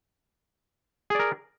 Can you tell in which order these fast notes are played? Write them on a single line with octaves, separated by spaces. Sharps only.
G#4 D5 A#4